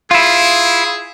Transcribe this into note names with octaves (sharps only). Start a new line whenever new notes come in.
E4 F4 G#4